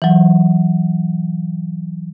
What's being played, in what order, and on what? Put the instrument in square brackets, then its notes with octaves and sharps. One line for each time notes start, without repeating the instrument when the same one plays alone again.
[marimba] E3 F#3